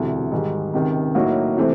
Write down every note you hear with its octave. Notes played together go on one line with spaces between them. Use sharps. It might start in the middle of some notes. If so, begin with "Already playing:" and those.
Already playing: E1 D2 C3 E3
G#2 D#3 G3
C#2 C3 D#3
A2 F#3 A#3 D#4 F#4
C3 E3 A3 C4